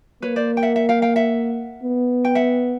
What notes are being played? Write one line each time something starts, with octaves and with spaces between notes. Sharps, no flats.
A#3 B4 C#5
C5 D5
G5
E5 F#5
E5 F#5
F5 G5
F5 G5
E5 F#5
B3
G5
E5 F#5